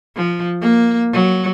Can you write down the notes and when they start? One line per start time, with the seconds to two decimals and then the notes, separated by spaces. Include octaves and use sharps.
0.16 F3
0.61 A#3
1.13 F#3